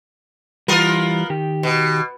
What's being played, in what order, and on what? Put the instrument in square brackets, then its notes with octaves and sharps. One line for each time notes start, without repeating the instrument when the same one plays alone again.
[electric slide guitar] E3 G3 [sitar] B3 F4 A#4
[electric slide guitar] D#3 G4
[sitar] B2